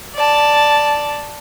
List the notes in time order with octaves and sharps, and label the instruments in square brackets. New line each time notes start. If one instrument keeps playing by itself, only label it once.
[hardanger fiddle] D5 A5